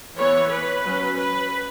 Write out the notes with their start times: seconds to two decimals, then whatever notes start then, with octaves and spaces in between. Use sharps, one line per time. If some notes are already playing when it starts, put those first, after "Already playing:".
0.17 E3 B3 C#5
0.50 B4
0.83 F#3 C#4
1.16 B4